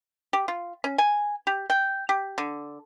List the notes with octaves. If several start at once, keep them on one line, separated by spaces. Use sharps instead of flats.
G4
F4
C#4
G#5
G4
G5
G4
D3